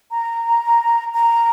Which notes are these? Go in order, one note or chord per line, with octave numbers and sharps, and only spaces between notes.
A#5
A#5